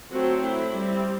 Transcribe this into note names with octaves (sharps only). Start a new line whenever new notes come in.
F#3 A3 C4 F#4
E4
G3 C4